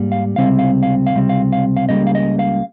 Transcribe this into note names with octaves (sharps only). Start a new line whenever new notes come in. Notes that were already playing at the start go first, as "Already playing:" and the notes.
Already playing: G#2 G3 A#3
F5
C#2 C3 G3 C4 F5
F5
F5
F5
C#2 C3 G3 C4
F5
F5
F5
C#2 C#3 G3 A#3 D#5
F5
D#5
F5